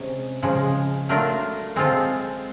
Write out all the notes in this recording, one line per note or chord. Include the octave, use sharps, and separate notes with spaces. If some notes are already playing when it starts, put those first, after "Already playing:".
Already playing: C3 G#3 C#4
C#3 F3 G#3
F#3 A3 D4 F4 A#4
G#3 C4 F4 A4